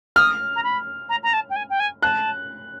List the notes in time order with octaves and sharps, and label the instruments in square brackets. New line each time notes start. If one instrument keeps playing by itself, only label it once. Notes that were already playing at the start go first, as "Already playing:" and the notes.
[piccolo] D#6 [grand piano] F6
[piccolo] A#5
B5
A#5
A#5
A5
G5
G#5
G5
G#5
[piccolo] A5 [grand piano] F#6